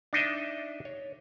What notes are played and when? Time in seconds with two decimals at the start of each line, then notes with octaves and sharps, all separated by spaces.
0.13 D4 D#4 D#5 E5
0.85 C#5